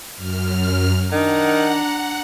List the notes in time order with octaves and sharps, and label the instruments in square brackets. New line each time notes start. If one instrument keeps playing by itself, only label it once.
[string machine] F#2 F6
[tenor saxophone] D#3 [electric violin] D4 A#5 [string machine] F#5